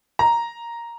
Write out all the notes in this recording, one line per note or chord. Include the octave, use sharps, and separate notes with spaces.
A#5